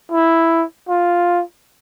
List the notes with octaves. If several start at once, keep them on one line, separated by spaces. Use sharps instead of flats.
E4
F4